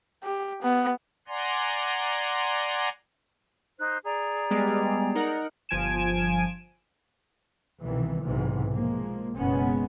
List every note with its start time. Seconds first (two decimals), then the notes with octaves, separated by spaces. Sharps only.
0.23 G4
0.62 B3
1.28 D5 F#5 G#5 A#5 C6
3.78 D#4 C5 F#6
4.05 G#4 D5 A#5
4.51 G3 G#3 B3
5.15 D#4 A#4 F#5
5.69 G1 F3 G#5 D7 E7
7.82 C2 B2 D#3 E3
8.24 B1 G#2 C3 E3
8.72 F3 G#3 A#3
9.36 F#1 B2 G#3 B3 C#4